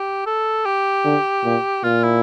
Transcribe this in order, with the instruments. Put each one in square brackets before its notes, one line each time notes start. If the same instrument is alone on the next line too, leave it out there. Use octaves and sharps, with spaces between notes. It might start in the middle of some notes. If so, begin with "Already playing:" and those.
Already playing: [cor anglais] G4
A4
G4
[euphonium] D3
A#2
[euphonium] A#2 [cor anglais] F4
[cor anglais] E4